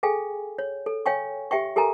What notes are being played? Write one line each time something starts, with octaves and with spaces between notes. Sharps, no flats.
G#4 A4 F5 G5 G#5
C#5
A4
C#5 F5 G5 G#5 C#6
G4 E5 G5 C#6
G4 A4 A#4 G#5 A#5